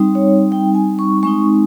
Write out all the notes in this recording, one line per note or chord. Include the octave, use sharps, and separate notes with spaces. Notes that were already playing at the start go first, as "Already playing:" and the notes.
Already playing: G3 C4 D#4
C#5
G5
G#5
C#6
G#3 C4 D#4 C#6